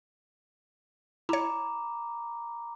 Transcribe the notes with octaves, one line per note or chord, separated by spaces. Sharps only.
E4 C#5 A#5 B5 D6